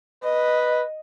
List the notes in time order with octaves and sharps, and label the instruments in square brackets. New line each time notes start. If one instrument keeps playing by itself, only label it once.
[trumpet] B4 [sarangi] D#5